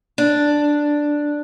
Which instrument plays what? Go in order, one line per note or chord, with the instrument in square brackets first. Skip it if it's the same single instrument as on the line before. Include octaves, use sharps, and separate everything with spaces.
[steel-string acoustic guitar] D4